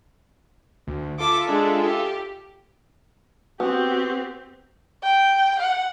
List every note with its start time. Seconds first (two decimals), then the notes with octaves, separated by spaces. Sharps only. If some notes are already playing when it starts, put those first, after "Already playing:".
0.87 D2
1.19 F4 A4 E5 D6
1.48 G#3 D4
1.84 G4
3.60 B3 C4 F#4 G4
5.03 G5
5.59 F#5